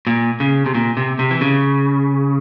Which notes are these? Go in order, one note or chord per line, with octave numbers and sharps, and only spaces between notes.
A#2
C#3
C3
A#2
C3
C3
E3
C#3